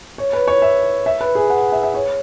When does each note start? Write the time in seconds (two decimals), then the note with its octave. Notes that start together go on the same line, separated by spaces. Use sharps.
0.18 C#5
0.33 B4
0.48 C#5
0.62 E5
1.06 E5
1.21 B4
1.35 G#4
1.50 F#5
1.72 E5
1.83 E5
1.94 C#5